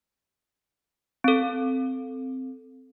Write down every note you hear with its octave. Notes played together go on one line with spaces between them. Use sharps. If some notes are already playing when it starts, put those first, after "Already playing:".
C4 A4